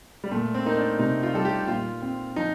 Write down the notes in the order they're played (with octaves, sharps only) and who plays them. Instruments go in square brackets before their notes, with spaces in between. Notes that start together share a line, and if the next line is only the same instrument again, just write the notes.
[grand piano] G3
[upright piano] A#2 [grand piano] A3
[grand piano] C4
[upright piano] A#3 [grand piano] D#4
[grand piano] D4
[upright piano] C3 [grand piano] D#4
[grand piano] F4
[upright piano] G3 [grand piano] A4
[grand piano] G4
[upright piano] A#2 [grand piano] F4
[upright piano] C4
[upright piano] F3 [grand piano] D#4